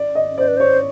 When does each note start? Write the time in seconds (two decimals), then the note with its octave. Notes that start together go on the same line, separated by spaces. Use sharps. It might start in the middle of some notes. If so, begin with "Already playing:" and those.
Already playing: D5
0.15 D#5
0.38 C5 D5
0.48 B4
0.57 C5 C#5